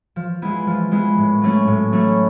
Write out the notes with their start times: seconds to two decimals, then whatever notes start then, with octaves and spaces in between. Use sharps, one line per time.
0.16 F3
0.42 G#3 B3 E4
0.67 F3
0.91 G#3 B3 E4
1.18 A2
1.42 F#3 A3 C#4 E4
1.67 A2
1.92 F#3 A3 C#4 E4